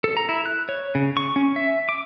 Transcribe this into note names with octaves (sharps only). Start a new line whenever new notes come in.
A4
A#5
E4
F#6
C#5
C#3
C#6
C#4
E5
D6